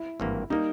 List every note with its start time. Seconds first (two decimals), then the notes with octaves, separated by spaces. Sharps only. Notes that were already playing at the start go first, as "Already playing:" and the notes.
Already playing: E4
0.20 G#1 G2 E3 A#3
0.50 G3 A#3 D#4